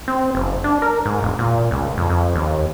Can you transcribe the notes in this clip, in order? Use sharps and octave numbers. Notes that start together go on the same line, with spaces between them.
C4
F#1
D4
A#4
G#2
E1
A#2
C#2
F2
F2
D#2